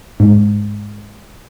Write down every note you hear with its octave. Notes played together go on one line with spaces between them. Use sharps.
G#2